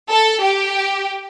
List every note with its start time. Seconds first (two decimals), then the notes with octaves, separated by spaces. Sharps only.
0.09 A4
0.41 G4